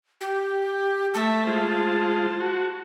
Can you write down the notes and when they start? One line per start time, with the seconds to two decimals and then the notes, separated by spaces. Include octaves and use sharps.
0.21 G4
1.14 A3 E5 A5
1.47 G#3 F4 C5
2.40 F#4